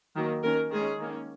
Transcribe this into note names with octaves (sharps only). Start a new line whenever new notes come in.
D#3 F#3 A#3
D#3 A#3 C#4 A#4
D#3 G#3 C#4 G#4
D#3 A#3 C#4